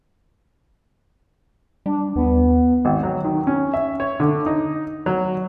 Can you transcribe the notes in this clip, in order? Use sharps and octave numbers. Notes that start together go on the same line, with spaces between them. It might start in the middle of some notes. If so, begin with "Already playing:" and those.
G3 D4
D#2 B3
G#1
F#3
D#3
C#4
E5
C#5
D3
D#4
F#3